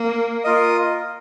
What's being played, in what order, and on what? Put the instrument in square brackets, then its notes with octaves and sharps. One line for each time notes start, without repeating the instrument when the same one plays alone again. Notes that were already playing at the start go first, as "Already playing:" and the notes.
Already playing: [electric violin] A#3
[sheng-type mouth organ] F4 A#4 D#5